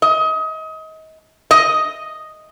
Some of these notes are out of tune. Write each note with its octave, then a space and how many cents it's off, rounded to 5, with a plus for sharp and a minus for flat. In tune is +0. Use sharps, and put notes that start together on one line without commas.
D#5 +30
D#5 +0